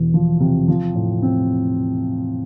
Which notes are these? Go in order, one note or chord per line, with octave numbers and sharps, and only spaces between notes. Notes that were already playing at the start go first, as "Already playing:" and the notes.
Already playing: E1 E2
F3
C3
F3
A2
C4